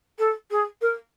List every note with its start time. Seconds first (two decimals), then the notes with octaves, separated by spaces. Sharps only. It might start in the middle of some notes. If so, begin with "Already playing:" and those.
0.19 A4
0.51 G#4
0.82 A#4